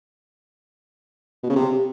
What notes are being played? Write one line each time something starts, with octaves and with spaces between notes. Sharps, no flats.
B2
C#3
C3